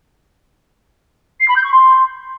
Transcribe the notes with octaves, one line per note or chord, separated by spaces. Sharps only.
C7
B5
G6
C#6
C6